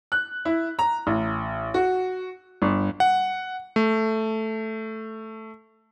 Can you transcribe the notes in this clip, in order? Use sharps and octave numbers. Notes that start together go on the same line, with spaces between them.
F#6
E4
A#5
A1
F#4
G1
F#5
A3